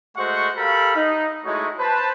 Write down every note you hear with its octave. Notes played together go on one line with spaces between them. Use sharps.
G#3 A3 F#4 C5 F#5 C#6
G4 A4 A#4 F5 B5
D#4
G#3 A3 D#4 E4 F#4 C#5
B4 C5 A5